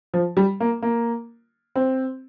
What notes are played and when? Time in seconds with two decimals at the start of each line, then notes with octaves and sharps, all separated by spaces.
0.14 F3
0.37 G3
0.60 A#3
0.82 A#3
1.76 C4